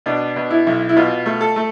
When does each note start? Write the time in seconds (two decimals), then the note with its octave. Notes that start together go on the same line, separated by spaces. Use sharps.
0.06 B2 D4
0.36 B2
0.50 E4
0.67 B1
0.89 E4
0.97 B2 F4
1.26 A3
1.41 A4
1.56 A3